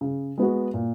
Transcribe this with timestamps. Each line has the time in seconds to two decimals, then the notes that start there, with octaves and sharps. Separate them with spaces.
0.01 C#3
0.38 G#3 B3 F#4
0.74 A#2